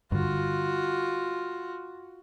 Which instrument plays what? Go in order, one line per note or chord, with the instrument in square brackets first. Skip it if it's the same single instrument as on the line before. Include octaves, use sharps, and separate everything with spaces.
[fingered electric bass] G2 D3 [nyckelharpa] F4 F#4